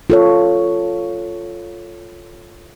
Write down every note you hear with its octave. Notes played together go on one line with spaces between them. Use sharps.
F4 A4 C#5